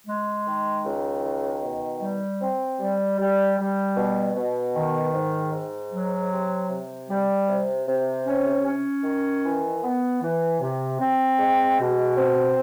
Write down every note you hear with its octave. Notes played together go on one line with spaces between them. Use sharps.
G#3
D#3
C#2
D#3
B2
G3
C4
G3
G3
G3
B2
B2
D#3
G#2
G#2
F#3
C3
C3
G3
C3
C3
C#4
C#4
D#3
E3
B3
E3
C3
C4
G#3
B2
C4